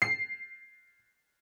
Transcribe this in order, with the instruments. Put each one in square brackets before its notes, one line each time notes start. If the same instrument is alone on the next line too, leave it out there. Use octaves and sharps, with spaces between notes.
[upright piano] C7